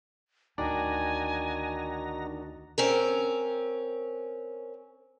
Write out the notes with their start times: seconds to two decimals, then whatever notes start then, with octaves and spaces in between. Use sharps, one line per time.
0.58 D2 D#3 D4 D#4 F#4 D5 G#5 A#5
2.78 C4 C#4 A#4